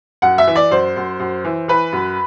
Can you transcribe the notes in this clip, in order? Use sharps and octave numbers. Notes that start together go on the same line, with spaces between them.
F#2 F#5
E5
E3
D5
F#2 C5
F#2
F#2
E3
E3 B4
F#2